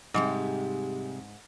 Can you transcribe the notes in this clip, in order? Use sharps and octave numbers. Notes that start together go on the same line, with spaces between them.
G#2 C3 G3 G#3